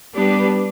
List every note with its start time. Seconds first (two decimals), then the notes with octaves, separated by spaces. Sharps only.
0.14 G3 B3 D4 G4 B4